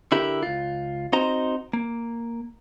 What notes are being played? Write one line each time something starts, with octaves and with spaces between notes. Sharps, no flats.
D3 E4 G4 A#4
C#2 F4
C4 D#4 F#4 C5 D#5 A#5
A#3